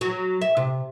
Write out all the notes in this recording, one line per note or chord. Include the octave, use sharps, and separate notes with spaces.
F#3
E5
C3